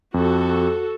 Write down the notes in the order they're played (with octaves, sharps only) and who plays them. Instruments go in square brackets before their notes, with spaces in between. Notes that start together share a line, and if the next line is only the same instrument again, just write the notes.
[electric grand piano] F2 [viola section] F#4 A4